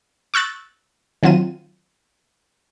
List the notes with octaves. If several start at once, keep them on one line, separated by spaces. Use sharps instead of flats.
C#6 E6 F#6 A6
D#3 F#3 C4 F4 D#7